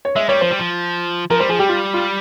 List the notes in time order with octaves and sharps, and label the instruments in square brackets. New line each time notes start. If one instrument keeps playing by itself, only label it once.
[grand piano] C#5
[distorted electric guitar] G#3 [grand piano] E5
[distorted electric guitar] G3 [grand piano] C#5
[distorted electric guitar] F3 [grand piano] C5
[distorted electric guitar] G3
F3
[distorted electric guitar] F3 [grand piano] A#4
[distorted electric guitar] G3 [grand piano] C5
[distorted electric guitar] F3 [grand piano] G#4
[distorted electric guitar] G3 [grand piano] G4
[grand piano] F4
F4